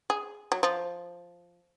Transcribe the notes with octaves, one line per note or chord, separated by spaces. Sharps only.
G#4
F#3
F3